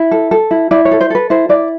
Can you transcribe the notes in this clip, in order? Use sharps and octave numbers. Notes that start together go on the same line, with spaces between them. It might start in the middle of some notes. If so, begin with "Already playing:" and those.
Already playing: E4
A4
A4
E4
E4 D5
C#5
A4
C5
A4 B4
E4 C5
E4 D5